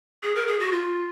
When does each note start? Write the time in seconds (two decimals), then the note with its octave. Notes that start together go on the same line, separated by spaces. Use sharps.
0.23 G#4
0.35 A#4
0.47 G#4
0.60 F#4
0.72 F4